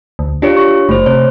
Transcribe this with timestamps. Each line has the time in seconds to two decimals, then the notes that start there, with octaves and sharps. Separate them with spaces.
0.19 D2
0.42 D4 F4 G4 C#5
0.57 C#6
0.89 F#1 A3 C5
1.06 C3 C#5